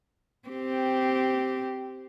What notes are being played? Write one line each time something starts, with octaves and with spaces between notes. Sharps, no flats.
C4 G4